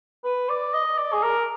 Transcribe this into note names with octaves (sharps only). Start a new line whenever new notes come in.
B4
D5
D#5
D5
G#4
A#4